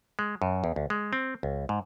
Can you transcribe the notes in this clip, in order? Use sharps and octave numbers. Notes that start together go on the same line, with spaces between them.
G#3
F#2
E2
D2
G#3
C4
C#2
G#2